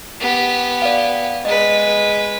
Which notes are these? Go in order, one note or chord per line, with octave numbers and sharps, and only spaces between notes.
B3 G4
D5 F5
G#3 B4 D#5